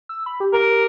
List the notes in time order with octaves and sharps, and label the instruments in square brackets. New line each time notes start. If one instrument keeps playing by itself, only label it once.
[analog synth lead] E6
B5
G4
[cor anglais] A#4